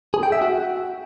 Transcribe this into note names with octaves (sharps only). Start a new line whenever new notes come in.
G#4
G5
E5
F#4